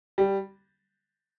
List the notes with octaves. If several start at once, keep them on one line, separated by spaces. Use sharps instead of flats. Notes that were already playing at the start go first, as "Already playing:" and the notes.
G3